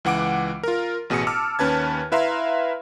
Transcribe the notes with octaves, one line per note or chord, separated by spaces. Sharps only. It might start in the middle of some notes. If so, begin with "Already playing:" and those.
C#2 E3 F#5 D6 D7
F4 A#4
A1 B2 G#4 D#6 C#7
A5 D6 E6 F6
D#2 C#4 B4 A5 G#6
E4 B4 E5 F5 A#5 C6